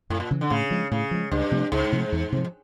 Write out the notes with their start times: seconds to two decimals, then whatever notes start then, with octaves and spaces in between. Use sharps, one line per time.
0.10 F#2 A2
0.20 A#2
0.31 C#3 E3
0.41 D3
0.50 A2 C#3
0.71 F3 G#3
0.91 A2 C#3
1.11 F3 G#3
1.31 C#2 G2
1.51 C3 F3 A3
1.72 C#2 G#2
1.92 C3 F3 A3
2.12 E2
2.32 C3 F3